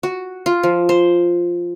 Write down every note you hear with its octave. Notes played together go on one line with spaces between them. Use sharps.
F#4
F4
F3
C5